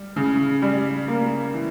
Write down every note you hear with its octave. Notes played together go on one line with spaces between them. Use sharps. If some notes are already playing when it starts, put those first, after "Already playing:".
Already playing: G3
C#3
G3
A#3
E3